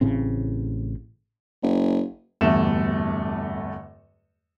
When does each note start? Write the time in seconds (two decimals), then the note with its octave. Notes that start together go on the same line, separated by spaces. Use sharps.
0.01 A1 A2 C#3 C4
1.62 F#1
2.41 D1 E2 G2 A3 E7